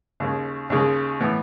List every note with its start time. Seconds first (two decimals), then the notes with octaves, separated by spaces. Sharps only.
0.20 D#2 C#3 G#3
0.70 D#2 C#3 G#3
1.20 A2 E3 B3